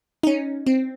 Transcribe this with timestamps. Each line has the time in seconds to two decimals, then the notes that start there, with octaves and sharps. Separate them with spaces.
0.23 D#4
0.27 C#4
0.66 C4